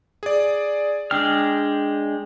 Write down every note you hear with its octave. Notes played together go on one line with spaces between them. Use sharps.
G#4 D5
G#3 D4 G5 F6